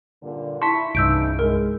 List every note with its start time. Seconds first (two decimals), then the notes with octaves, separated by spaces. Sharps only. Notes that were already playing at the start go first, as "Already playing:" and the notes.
0.22 G2 A#2 D3
0.62 E4 A5 C6 C#6 B6
0.95 C2 G2 C#3 E3 D#4 E6 G6 D7
1.39 G#3 A#4